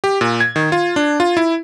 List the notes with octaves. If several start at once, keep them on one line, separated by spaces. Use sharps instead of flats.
G4
A#2
G#6
D#3
F4
D4
F4
E4